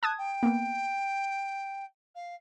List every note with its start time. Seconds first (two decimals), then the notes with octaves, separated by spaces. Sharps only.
0.03 A5 D#6 F#6 G#6
0.18 G5
0.43 A#3 B3
2.15 F5